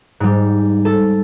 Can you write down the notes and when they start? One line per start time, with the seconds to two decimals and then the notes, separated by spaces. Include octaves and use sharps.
0.20 G#2 G3
0.85 A4